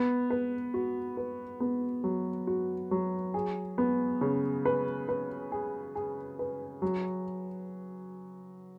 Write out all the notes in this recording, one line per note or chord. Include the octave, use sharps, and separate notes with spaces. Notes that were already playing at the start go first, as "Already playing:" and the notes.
Already playing: B3
B4
F#4
B4
B3
F#3
F#4
F#3
G#4
B3
C#3
B4
B4
G#4
G#4
B4
F#3